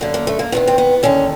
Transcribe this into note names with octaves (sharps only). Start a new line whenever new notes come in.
F#2 D3 A#3
A#3
A3
A#3
E2 C3 D#3 B3
C4
B3
D#2 D3 C#4